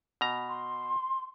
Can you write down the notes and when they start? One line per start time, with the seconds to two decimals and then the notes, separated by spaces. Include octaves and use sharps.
0.21 B2 A#5
0.49 C6